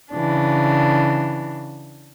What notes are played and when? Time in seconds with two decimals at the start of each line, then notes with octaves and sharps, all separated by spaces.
0.12 C#3 E3 D4